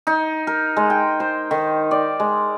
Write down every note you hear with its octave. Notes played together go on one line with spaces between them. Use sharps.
D#4
A#4
G#3
G5
C5
D#3
D5
G#3